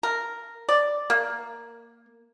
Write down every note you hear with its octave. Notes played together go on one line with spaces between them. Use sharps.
A#4
D5
A#3